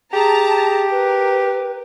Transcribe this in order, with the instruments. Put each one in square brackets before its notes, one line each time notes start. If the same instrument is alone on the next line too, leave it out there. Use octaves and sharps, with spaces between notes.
[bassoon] G4 [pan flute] G#4 [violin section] A5 A#5
[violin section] A#4 [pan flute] B4